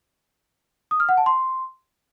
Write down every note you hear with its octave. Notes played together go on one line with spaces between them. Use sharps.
D#6
F6
F#5
A5
C6